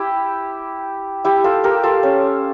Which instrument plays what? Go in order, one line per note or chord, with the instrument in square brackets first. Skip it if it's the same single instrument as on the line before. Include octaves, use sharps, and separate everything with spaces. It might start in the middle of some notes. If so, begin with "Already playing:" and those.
Already playing: [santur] E4 G4
E4 G4
F4 A4
G4 A#4
F4 A4
C#4